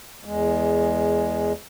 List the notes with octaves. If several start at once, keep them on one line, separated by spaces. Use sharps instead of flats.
E2 G#3